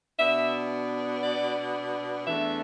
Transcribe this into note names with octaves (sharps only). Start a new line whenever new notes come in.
B2 B3 D4 E5
D5
E2 E3 A3 D4 E5